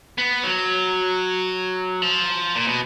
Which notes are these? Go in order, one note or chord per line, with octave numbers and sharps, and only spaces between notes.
B3
F#3
F3
A#2
B2